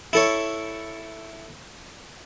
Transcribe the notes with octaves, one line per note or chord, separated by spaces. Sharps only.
E4 A4 C#5